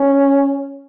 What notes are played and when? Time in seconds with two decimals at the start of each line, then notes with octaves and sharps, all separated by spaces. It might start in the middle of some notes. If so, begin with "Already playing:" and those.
Already playing: C#4